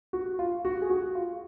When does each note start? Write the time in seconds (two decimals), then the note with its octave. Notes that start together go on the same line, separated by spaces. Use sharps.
0.13 F#4
0.39 F4
0.65 F#4
0.82 G#4
0.90 F#4
1.15 F4